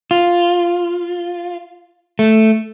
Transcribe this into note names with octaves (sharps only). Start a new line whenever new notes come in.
F4
A3